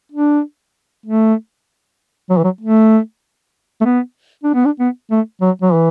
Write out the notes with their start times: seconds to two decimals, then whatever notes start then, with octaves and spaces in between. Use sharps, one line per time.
0.12 D4
1.06 A3
2.30 F#3
2.38 E3
2.44 F#3
2.61 A3
3.81 A3
3.85 B3
4.44 D4
4.54 B3
4.65 D4
4.79 B3
5.11 A3
5.41 F#3
5.62 F#3
5.73 E3